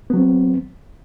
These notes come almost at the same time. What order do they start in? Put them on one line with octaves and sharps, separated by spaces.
B3 F#3 C4